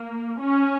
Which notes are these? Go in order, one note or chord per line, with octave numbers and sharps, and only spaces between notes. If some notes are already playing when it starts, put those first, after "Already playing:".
Already playing: A#3
C#4